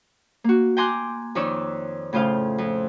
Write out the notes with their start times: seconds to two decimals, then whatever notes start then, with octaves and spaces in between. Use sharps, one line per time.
0.44 A#3 F#4
0.77 G5 G#5 A#5 C6 D6 F#6
1.35 F2 D#3 D#4 C#5 D5 E6
2.13 A2 C#3 F4 C5 F5
2.58 F2